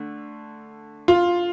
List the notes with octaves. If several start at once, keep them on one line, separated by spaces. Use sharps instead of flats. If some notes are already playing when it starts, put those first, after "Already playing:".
Already playing: D3 A3
F4